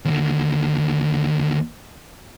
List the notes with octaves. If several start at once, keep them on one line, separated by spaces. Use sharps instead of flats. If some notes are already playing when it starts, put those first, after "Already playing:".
D#2 D3